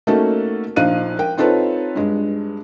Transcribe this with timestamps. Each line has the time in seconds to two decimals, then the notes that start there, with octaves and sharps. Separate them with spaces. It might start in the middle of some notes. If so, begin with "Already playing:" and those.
0.07 A3 A#3 C#4 D#4 F#4 A4
0.76 A#1 F3 D#4 F5 F#6 D#7
1.19 A#4 G5
1.37 C4 D#4 F4 A4 B4 C#5
1.95 G2 G#3